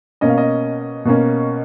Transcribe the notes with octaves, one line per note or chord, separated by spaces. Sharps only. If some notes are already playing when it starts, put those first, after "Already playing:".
B2 A#3 C#4 D#5
F5
D#5
B2 A#3 C#4